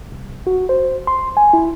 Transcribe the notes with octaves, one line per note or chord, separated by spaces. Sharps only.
C2
F#4
C5
C6
G#5
E4